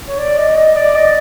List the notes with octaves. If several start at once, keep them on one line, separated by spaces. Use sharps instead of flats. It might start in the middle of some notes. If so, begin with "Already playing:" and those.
C#5
D5
D#5
D#5
D5
D#5